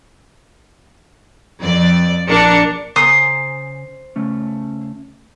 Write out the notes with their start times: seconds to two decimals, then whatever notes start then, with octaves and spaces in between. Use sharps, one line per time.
1.61 F2 D5
2.29 A#1 D4 A#4 C#7
2.96 C#3 C5 G#5 A#5 D#6
4.16 C#3 A3 C#4